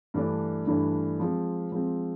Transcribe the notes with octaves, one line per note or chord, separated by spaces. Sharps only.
G2 E3 A3 D4
G2 E3 A3 D4
F3 G#3 C4
F3 G#3 C4